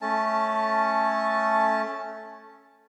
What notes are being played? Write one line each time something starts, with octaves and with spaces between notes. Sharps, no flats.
A3 C#4 A5